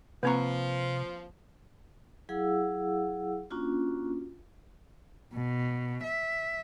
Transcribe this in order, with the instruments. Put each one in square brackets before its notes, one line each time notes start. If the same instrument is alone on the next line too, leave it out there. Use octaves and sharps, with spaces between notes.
[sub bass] C3 [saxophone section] F3 [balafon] A#3 C4 A#5 [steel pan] B4 C#6
[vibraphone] F#3 E4 G#4 F5 F#5 E6
A#3 C#4 D4 F4 F#4
[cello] B2
E5